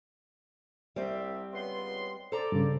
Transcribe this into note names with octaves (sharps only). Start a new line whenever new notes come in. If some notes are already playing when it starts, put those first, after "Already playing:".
C2 G3 C4 E5
C#2 B3 C6
A4 C5 D5 A#5
G2 C#3